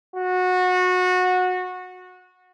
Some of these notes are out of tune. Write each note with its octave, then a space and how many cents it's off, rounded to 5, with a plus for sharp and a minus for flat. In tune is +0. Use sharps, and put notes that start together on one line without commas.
F#4 -20